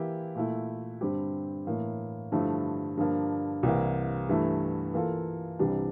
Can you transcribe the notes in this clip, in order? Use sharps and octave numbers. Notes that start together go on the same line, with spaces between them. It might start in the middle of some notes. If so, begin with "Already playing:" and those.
Already playing: E3 A#3 E4 G4
A#2 A3 E4
G2 D3 G3 C4 G4
A2 E3 A#3
G2 D3 F3 A3 E4
G2 D3 F3 A#3 D4
C2 C3 E3 A#3
G2 E3 A3 E4
E3 A#3 F4 A4
C2 C3 E3 G3 D4